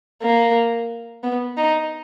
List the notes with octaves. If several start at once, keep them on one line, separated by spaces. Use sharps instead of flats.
A#3
B3
D#4